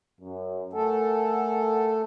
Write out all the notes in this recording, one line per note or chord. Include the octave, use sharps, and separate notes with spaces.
F#2
A3 A4 A#4 F#5 G#5